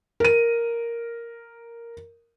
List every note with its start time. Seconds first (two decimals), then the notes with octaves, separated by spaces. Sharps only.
0.20 A#4 D#7